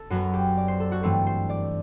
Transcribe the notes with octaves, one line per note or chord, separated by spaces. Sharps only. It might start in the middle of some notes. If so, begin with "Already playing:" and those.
Already playing: A4
F#2 F#3 B3 F#4
G4
D5
C5
A4
F#4
G2 E3 A3 C4 A4
C5
D5